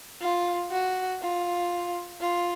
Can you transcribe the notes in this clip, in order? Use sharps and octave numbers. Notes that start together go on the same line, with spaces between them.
F4
F#4
F4
F4